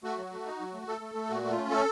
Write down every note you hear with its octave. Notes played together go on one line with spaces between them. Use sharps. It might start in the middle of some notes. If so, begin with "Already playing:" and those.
A3 F#4
F#3
A3
D#4
F#3
A3
A3 A4
A3
A3
A#2 F#4
A3
F4
C#4
A3 A4